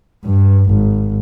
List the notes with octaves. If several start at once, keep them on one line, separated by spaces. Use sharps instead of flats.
G2
G#1